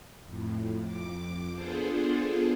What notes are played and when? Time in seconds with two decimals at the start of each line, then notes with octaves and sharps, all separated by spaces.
0.24 F2 A2
0.79 F2 D6
1.51 B3 D4 F4 G#4 A4 C5